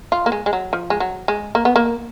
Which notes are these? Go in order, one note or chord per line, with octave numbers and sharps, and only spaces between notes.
F4
A#3
G#3
G#3
F#3
F3
G#3
F#3
G#3
A#3
B3
A#3